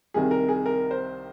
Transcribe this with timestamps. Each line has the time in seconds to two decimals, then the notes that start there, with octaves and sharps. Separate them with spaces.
0.14 C2 C3 D#3 G#4
0.31 A#4
0.49 G#4
0.66 A#4
0.91 C5